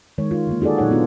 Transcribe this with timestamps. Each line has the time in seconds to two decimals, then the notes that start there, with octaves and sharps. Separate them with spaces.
0.18 D#3 G#3 C#5
0.31 F4
0.47 D3 D#3 A#3
0.61 D#4 F#4 G#4 A4 D5
0.78 A#2 F#3 D#4 C#5 F#5
0.91 B3 D4 F4